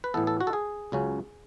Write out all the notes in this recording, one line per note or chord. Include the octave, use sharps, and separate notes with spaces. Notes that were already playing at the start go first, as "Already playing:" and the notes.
B4
A2 E3 B3 A4
A4
F#4
A4
G#4
C#2 C#3 F#3 C#4